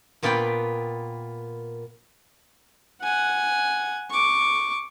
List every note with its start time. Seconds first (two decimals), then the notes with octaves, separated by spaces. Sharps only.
0.23 A#2 B3 F4 D5 G5 B5
3.02 F#5 G#5
4.10 C#6 D6